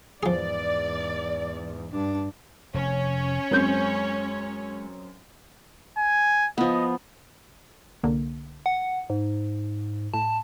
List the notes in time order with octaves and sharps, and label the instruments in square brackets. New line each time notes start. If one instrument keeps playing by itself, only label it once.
[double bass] E2 G#2 [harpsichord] F3 G#4 [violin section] D5
[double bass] G2 D4
[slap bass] F1 [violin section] C#4 C#5
[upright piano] F#2 C4 G6 [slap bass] G#3
[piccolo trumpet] G#5
[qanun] F3 B3 [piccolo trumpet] D#5
[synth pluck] C2 D3 A#3
[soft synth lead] F#5
G#2
[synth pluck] A2 [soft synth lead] A5